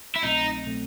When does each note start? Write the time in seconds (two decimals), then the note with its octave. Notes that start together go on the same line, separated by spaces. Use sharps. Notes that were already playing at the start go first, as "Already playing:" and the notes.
0.16 E4
0.23 C2 B2 F#3 A3 C4 D#4
0.66 B2 F#3 A3 C4